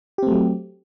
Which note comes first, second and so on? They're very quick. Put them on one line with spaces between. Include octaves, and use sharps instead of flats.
G4 C4 A3 F#3